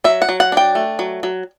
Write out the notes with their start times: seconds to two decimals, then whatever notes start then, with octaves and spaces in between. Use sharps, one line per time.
0.04 F#3 E5
0.22 F#5
0.29 F#3
0.40 F#5
0.52 D4 G5
0.75 A3
0.99 F#3
1.23 F#3